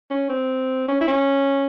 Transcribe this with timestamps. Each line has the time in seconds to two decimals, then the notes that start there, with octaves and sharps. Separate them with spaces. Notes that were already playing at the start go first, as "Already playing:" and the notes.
0.11 C#4
0.29 C4
0.88 C#4
1.01 E4
1.08 C#4